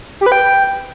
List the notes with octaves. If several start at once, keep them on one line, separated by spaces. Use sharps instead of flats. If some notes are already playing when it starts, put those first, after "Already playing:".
G4
B4
G5